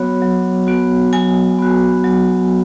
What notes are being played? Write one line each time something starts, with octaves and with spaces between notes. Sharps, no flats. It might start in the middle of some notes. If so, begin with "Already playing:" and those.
Already playing: F#3 B3 F#4 C#5
F#3
B3 F#4
F#3 G#5
B3 F#4
F#3